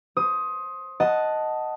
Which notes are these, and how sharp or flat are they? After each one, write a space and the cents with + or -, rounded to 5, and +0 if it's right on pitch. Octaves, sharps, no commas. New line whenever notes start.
C5 +20 D#6 +15
D#5 +0 F#5 +0 A5 +0